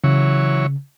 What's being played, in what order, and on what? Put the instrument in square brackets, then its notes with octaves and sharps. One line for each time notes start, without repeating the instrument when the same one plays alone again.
[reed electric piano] C#3 [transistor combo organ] E3 F#3 C#5